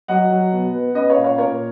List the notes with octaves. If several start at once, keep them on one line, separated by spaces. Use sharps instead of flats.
F#3 D#5 F#5
F#3
B2
B3
C#4 B4 D#5
C#5 F5
A#2
C#5 F5
A#2 A#4 C#5